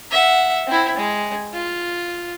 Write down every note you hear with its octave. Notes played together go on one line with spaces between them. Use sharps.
E5 F#5
C4 E4
G#3
F4